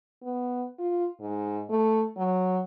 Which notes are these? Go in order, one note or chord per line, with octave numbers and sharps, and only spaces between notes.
B3
F4
G#2
A3
F#3